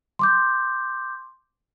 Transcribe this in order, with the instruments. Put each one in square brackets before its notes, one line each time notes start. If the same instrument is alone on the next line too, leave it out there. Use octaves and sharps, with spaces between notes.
[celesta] C6 D6 G6